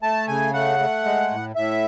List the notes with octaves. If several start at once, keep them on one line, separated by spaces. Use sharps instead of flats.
A3 A5
C#3 G#5
A3 F#5
A3
G#3
A2
A2 E5